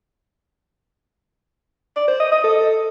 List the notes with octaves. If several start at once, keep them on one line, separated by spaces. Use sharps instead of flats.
D5
C5
D#5
D#5
A4